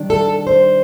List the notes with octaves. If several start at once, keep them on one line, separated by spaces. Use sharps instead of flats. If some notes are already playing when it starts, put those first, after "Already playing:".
Already playing: D#3 G3 D4
A4
C5